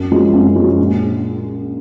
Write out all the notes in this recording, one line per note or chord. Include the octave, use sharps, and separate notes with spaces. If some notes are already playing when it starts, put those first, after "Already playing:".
Already playing: F#2
F3 G#3 C#4 F#4
F#2
F3 G#3 C#4 F#4
A#1